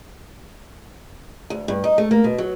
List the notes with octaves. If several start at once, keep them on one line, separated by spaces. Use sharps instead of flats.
D2
G2
D#4
A3
A#3
B2
F#3